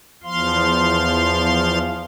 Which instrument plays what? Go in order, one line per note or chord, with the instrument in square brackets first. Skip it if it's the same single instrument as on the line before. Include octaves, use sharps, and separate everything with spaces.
[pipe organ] E2 F3 F5 C6